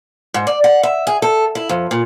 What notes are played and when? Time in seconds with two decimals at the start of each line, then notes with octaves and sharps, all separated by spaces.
0.34 G#2
0.47 D5
0.64 F#5
0.83 E5
1.07 G#4
1.22 A4
1.55 E4
1.69 F2
1.91 A#2